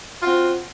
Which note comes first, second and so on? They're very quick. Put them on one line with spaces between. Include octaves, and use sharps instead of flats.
F4 F#4 C4